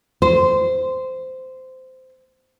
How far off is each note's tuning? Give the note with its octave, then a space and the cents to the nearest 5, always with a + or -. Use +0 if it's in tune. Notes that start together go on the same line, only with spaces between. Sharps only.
C5 -15